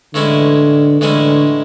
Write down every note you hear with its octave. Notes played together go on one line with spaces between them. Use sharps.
A2 D3 E3 G#3 C#4 E4
A2 D3 E3 G#3 C#4 E4